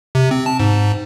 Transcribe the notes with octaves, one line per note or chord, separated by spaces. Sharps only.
C3
C4
A5
G#2